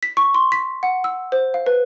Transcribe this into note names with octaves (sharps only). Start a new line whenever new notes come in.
B6
C#6
C6
B6
F#5
E6
C5
F5
B4